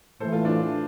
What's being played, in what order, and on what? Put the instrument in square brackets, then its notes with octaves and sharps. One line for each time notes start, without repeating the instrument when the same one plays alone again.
[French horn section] A2 E3 A3 [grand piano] A4 C5
[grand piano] F4 A4
D4 F4